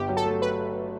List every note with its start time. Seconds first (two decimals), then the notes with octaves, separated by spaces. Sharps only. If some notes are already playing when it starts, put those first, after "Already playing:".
Already playing: G1 G4
0.09 F#3
0.17 A4
0.25 A3
0.42 B4